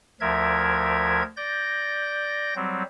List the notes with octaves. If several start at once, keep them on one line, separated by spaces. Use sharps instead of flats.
D2 F3 A#4 E5 G#6
D5 G6 A#6
F#3 G3 C4